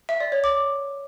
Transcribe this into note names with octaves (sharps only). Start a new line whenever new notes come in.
E5
D5
C#5
D6